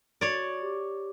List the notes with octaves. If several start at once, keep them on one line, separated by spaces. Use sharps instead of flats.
F#4 C#5 D5
G4 D6